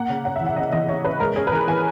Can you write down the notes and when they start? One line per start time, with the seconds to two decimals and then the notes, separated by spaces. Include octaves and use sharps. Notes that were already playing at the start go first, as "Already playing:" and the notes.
Already playing: A#3 F#5
0.09 C#3
0.25 C#4 F#5
0.36 E5
0.41 E3
0.46 F#5
0.56 C#3 D#5
0.72 E3 D#5
0.88 C#3 C#5
1.04 C#4 B4
1.20 G#3 A#4
1.36 C#4 G#4
1.47 B4
1.52 E3 A#4
1.67 E3 G#5